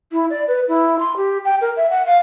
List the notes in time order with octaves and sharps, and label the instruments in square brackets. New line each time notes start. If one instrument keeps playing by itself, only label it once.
[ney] E4
D5
B4
E4
C6
G4
G5
A#4
E5
F#5
F5